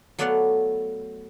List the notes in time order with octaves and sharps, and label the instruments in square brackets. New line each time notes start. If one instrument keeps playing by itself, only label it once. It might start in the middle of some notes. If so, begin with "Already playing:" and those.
[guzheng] F#3 A3 B3 D5 F5 F#5